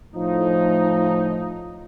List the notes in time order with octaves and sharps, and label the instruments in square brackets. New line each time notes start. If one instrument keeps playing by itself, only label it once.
[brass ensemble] A2 F3 D#4